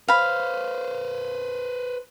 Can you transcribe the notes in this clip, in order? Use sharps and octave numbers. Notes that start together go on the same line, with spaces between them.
B4 C5 F5 B5